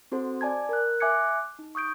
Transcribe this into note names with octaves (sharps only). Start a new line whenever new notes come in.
C4 F#4 A4 C5
D5 G#5 A5 G#6
A#4 F#6
E5 G#5 D6 F#6 G#6 C#7
D#4
C#6 D#6 G6 D7